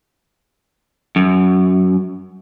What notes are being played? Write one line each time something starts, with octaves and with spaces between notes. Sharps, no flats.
F#2